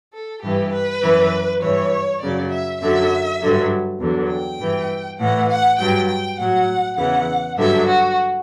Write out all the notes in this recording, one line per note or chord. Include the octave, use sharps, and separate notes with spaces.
A4
G2 E3 G4
B4
F#2 E3
G2 E3 C#5
F#2 C#3 F#3 D5
E5
F#2 D3 F#3 E5
G2 D3 F#3
E2 D3 F#3
G5
G2 E3
A2 E3 F#5
F#5
G2 F#3 G5
G5
A2 F#3 F#5
E2 C#3 E3 F#5
G2 D3 F#3 E5
F#4